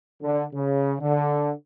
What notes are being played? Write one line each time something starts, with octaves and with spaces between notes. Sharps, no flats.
D3
C#3
D3